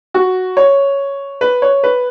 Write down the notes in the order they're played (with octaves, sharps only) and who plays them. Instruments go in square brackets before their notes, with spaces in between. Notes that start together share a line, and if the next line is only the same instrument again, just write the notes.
[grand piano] F#4
C#5
B4
C#5
B4